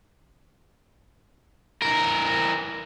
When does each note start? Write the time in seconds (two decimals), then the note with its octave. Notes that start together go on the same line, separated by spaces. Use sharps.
1.82 E3 A#4